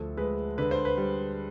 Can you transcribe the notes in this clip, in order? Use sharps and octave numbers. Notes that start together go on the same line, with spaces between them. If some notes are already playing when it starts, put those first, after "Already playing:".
Already playing: D2 F3 A4
G#3 B4
D3 B4
C5
B4
G3